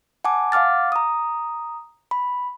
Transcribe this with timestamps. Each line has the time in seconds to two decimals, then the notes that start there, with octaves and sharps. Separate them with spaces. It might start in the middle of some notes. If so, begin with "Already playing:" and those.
0.24 F#5 G#5 A5 D6
0.52 F5 F#5 D6 F6 A6
0.92 A#5 D#6
2.11 B5